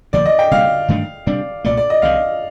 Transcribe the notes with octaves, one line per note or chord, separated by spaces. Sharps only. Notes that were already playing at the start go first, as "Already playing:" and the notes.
D2 C3 F3 A#3 D5
D#5
G5
C3 G3 A#3 F5
G2 D#3 A3 D4
C3 G3 D4 D5
C2 A#2 A3 D5
D5
D#5
C2 C3 D#3 F5